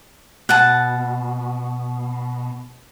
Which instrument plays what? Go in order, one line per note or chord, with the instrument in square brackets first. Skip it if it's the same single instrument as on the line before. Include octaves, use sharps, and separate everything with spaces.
[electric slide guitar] B2 [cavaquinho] F#5 A5